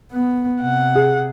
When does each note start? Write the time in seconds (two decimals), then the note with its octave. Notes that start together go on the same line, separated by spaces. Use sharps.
0.12 B3
0.62 C3 F#5
0.95 G#4